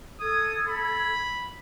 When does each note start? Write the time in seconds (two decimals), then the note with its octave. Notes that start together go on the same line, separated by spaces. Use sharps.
0.20 A4 D#6 G#6
0.68 B5